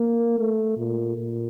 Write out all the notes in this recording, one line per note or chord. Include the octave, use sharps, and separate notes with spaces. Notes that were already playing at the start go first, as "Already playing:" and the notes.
Already playing: A#3
A3
A#2
A#2